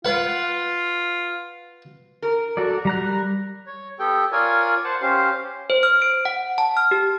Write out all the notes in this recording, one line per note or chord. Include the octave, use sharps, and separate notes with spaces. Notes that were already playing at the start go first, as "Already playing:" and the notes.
F4 B4 F#5
A#4
F#4 A4 D5
G3 A#5 F#6
C#5
B3 G4 A4 G5
F4 A#4 C#5 D5 G#5
C5 F#5 A5
C#4 G4 C5 F5
C5
F6
D7
F#5
A5
F6
G4